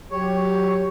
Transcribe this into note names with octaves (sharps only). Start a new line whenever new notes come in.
F#3 G4 C#5